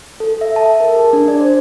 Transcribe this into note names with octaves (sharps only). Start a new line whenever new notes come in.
A4
E5
A5
A#4
G#4
D4
D5
C5